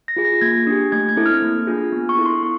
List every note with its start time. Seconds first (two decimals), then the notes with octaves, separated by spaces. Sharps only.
0.08 A#6
0.17 F4 G#4
0.25 A#6
0.41 A#3 G#6
0.67 D4 G4
0.92 A3 G#6
1.09 G#6
1.16 C4 E4 A4
1.26 F6
1.42 A#3
1.67 D4 F4 G#4
1.92 B3
2.09 C#6
2.18 E4 A4
2.26 C6
2.43 B3 C#6